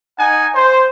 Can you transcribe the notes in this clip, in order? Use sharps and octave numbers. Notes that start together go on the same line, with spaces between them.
D#4 F#5 G#5
C5